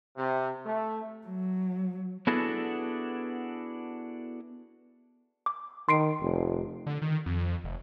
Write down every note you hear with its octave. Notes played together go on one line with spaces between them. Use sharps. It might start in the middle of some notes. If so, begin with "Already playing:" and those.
C3
A3
F#3
B3 D4 E4 F#4 G#4 A4
D6
D#3 C6 C7 D7
F1
D3
D#3
F2
F1